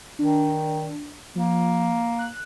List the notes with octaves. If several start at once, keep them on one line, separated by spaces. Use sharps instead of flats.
D#3 D4
F3 A#3
F#6